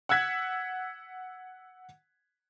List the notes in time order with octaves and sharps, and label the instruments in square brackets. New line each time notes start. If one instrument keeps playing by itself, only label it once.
[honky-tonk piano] F#5 E6 F#6 G#6 B6